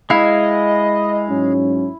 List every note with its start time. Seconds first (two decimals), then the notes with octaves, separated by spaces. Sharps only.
0.10 G#3 E4 D#5 F5
1.29 G#2 F#3 C#4